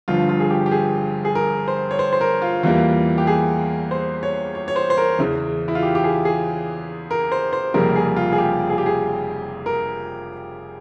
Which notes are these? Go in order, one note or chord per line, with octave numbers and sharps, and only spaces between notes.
G1 G2 F3 F4
F4
G#4
G4
G4
G#4
G#4
A#4
C5
C#5
C5
C5
A#4
F4
E2 E3 G3 A#3 F4
G4
G#4
C5
C#5
C#5
C#5
C5
C5
A#4
E2 C#3 E3
E4
F4
G4
G4
G#4
G#4
A#4
C5
C5
F1 F2 C#3 G3 A#3 A#4
G#4
F4
G#4
G4
G#4
G4
G#4
A#4